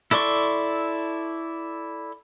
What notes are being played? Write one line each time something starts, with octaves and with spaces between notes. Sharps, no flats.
E4 A4 D5 C6 C#6